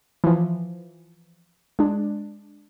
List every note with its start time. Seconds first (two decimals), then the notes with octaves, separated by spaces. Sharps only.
0.24 E3 F3
1.79 G#3 D4